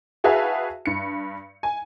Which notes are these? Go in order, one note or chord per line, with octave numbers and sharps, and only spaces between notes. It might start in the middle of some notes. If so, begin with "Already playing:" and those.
F#4 G#4 B4 E5 F5 A5
G2 C#7
G#5